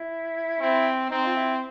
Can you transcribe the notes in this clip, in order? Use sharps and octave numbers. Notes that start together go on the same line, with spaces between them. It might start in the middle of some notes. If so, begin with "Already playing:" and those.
Already playing: E4
C4 E4
C4 D#4
F4
E4